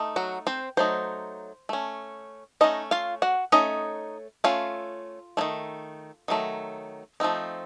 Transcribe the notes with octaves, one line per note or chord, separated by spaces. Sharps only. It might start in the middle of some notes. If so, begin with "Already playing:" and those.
Already playing: A3 D#4
F#3 F#4
C4 C5
F#3 A3 D#4 C5
A3 C#4
A3 C#4 D#4 D#5
F4 F5
F#4 F#5
A3 C#4 D#4 D#5
A3 C#4 F4 F5
D#3 F#3 A3
D#3 F#3 A3
F3 A3 C4 D#4